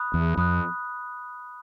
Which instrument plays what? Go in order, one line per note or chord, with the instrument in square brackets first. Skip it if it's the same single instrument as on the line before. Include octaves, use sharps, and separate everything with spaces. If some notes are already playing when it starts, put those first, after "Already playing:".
Already playing: [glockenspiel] B5 D#6 F#6
[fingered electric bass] E2
[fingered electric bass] F2 [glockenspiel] B5 D#6 F#6